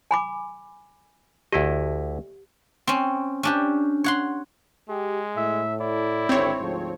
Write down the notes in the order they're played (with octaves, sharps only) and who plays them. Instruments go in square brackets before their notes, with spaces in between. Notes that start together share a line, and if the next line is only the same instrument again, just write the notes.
[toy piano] G#5 B5 D6
[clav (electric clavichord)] D2 E4 D#5 [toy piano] G4
[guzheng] C4 C#4
C#4 D4 G4
C#5 F#5 C6
[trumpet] G#3 [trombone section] G4
[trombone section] A2 [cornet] E5
[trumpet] E4 [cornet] D5
[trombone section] G#1 D2 [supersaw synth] C4 C#5
[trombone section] D2 G#2 F3